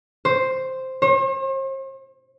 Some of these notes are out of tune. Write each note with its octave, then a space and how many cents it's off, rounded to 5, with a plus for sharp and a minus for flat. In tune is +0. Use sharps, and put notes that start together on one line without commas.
C5 +0
C5 +45